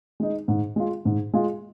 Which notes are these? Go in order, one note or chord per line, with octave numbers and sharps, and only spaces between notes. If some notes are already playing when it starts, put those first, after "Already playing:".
G#3 D#4
G#2
G#3 F4
G#2
G#3 F4